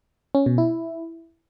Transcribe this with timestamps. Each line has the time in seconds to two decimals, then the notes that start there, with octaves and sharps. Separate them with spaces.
0.35 C#4
0.46 B2
0.58 E4